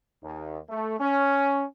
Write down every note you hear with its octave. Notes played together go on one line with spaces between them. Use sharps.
D#2
A3
C#4